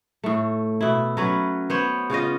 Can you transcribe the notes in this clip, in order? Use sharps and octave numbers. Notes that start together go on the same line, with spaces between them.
A2 A3
B2 E4
F#3 C#4 B4
B3 C5 C#5
C#3 C#4 F4 D#5